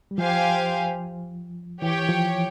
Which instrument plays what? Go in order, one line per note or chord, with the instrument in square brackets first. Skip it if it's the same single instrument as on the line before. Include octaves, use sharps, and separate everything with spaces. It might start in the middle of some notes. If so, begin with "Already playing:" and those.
[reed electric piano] G3
[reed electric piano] F3 [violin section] G4 C5 F5 G#5
[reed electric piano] E3 [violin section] G4 C#5 G5
[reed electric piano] F3